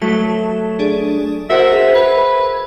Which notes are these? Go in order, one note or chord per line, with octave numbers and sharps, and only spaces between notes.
F#3 A3 A5
D4 G#4 D5
F#4 A#4 C5 D#5 E5 F#5
G#4 F7
B4 G#6